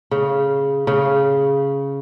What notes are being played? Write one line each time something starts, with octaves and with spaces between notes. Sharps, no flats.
C#3
C#3